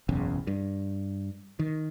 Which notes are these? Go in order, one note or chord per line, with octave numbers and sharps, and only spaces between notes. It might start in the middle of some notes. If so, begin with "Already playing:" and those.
F#1 B1 E2 C#3
G2
D#3